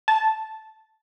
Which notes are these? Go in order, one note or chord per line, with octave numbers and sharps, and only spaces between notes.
A5